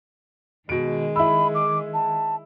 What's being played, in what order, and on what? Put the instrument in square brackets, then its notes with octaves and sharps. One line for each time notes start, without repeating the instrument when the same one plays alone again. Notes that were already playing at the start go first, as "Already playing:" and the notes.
[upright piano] B2 D7 [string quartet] D#3 G#3
[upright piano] E4 E6 [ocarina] B5
[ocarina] D6
A5